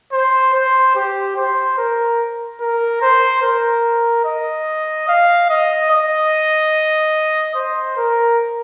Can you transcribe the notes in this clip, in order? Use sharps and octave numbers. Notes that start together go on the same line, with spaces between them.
C5
C5
G4
C5
A#4
A#4
C5
A#4
D#5
F5
D#5
D#5
C5
A#4